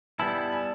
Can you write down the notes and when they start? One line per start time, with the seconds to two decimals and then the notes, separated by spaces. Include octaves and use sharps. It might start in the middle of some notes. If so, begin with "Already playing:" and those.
0.19 G3 B3 E4 A5
0.35 A5
0.52 G#5